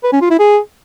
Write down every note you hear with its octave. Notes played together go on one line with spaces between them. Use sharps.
B4
C#4
F4
E4
G#4